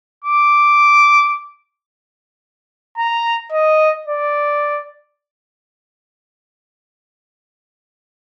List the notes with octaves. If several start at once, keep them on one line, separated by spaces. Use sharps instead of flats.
D6
A#5
D#5
D5